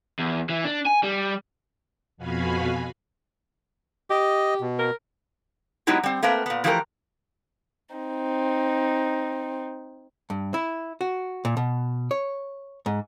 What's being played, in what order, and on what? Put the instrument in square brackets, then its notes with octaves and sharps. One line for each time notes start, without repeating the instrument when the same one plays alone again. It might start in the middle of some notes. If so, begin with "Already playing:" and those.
[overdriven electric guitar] E2
E3
D4
G#5
G3
[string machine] F2 B2 F#4 F5 G#5 B5
[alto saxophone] G4 [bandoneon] D#5
[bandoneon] B2
[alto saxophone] A#4
[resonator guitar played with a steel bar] F#3 G#3 B3 D#4 E4 G4
G3 C4
A3 A#3 C4 A#4 B4
A#2 B3
E3 F3 A3 G4 G#4 A#4
[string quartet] C4 D#4
[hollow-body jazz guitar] G2
E4
F#4
A#2
B2
C#5
G#2